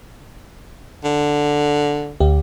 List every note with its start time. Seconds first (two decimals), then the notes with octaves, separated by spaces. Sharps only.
1.04 D3
2.20 D2 G4